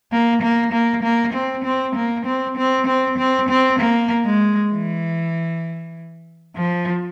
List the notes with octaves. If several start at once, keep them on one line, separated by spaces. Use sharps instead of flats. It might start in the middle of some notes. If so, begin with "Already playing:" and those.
A#3
A#3
A#3
A#3
C4
C4
A#3
C4
C4
C4
C4
C4
A#3
G#3
E3
F3